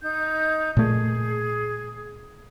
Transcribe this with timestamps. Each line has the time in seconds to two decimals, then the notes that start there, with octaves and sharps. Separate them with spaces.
0.01 D#4 G6
0.77 A#2 A3 G#4